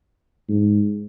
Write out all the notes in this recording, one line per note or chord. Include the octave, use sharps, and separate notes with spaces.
G#2